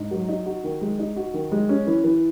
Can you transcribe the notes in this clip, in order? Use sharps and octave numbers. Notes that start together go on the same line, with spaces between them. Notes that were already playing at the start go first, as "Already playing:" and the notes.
Already playing: G#2
F#3
D#4
F#4
D#3
G#3
D#4
F#4
D#3
G#3
C#4
E3
E3